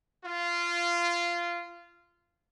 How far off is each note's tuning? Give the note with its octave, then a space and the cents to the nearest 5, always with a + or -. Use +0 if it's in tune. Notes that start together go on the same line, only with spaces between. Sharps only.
F4 -15